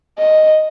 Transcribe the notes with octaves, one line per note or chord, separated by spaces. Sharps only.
D#5